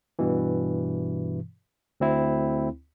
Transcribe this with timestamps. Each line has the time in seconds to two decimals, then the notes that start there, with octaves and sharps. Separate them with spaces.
0.19 G2 B2 E3
2.00 D2 C4 E4